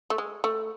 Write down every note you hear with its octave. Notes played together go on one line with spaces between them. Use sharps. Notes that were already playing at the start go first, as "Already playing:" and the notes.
A3
G#3
A3